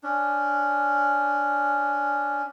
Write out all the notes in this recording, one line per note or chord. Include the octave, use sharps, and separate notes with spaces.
C#4 D4